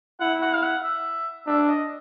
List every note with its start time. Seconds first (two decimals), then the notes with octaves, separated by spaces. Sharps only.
0.20 E4 F#5
0.42 F#5
0.54 F5
0.63 F#5
0.83 E5
1.47 D4 E5
1.68 D#5